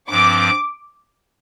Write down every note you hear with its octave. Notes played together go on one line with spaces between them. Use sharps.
G2 F3 C4 D6